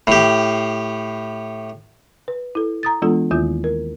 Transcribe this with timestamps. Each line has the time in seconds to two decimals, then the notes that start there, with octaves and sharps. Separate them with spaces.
0.07 A2 G4
2.28 B4
2.55 E4 A4
2.83 A#5 D#6 A6
3.02 E3 G#3 B3 D4 F4 A4
3.31 D#2 D#3 A#3 E4 F4 G6
3.64 A#4